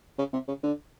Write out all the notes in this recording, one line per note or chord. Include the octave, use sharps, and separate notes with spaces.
C#3
C3
C#3
D3